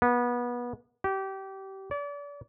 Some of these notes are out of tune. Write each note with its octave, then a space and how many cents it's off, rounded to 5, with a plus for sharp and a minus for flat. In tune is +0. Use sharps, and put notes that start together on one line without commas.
B3 -25
G4 -25
D5 -35